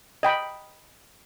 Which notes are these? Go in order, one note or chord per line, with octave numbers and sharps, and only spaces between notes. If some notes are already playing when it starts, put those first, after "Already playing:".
D#5 G5 B5